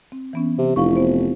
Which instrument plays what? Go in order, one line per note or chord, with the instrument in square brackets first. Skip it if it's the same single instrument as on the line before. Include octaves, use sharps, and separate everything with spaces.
[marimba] C4
E3 B3 C#4
[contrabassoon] C3
[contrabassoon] F1 [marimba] E4 F5 C#6
[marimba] B3 C5